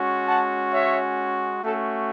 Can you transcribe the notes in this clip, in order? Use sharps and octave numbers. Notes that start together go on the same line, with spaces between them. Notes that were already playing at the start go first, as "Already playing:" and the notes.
Already playing: G#3 C#4 F#4
F#5 A5
C#5 E5
A3 C#4 F#4 A4